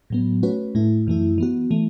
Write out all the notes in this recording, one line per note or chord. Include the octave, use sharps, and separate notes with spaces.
A2 F#3 B3
A3 C#4 F#4 B4
A2 A3 E4
F#2 E3 A3 E4
E3 B3 F#4
E3 A3